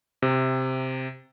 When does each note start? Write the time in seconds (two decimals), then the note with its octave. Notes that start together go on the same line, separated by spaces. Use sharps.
0.22 C3